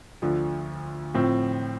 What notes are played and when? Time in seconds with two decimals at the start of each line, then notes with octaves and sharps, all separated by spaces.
0.22 D2 D3 F3
1.14 A2 F3 C4